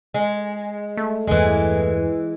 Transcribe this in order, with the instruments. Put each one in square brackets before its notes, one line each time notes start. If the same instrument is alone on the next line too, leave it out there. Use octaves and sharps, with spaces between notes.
[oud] G#3
[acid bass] A3
[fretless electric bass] E2 G2 [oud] E3 G#3